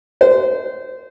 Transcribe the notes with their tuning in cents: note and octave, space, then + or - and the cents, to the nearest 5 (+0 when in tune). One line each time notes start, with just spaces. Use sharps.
C5 -25